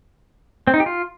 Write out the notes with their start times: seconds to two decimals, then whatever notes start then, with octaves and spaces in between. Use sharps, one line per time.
0.67 C4
0.74 D#4
0.80 G4
0.86 F4